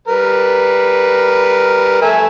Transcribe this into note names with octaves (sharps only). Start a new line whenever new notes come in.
G3 A#4 B4
A3 E5 G#5